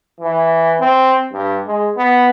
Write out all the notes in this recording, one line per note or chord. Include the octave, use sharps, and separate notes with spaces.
E3
C4
G2
G#3
B3